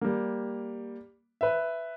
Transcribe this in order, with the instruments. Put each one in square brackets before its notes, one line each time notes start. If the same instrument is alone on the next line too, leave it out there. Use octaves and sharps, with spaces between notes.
[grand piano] G3 A#3
B4 E5